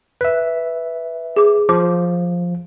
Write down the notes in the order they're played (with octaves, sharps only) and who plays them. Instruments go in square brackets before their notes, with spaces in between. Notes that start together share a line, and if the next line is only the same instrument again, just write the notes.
[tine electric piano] B4 E5
[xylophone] G#4 D6
[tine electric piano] F3 [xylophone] D6